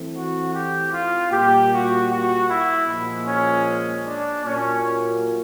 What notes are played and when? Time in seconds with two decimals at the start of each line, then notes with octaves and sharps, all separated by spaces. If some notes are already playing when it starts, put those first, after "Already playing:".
Already playing: E3 A3 C4
0.15 F#4
0.53 G4
0.93 F4
1.32 A#2 G3 A#3 G4
1.71 F#4
2.10 F#4
2.48 E4
2.88 A#2 F3 G#3
3.27 C#4
4.05 D4
4.44 A#2 F#3 A#3 C#4